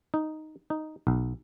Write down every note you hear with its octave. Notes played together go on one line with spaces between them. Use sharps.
D#4
D#4
B1